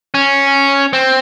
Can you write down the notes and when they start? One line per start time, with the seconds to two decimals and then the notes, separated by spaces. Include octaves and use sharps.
0.14 C#4
0.93 C4